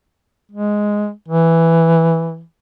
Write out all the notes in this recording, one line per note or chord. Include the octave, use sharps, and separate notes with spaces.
G#3
E3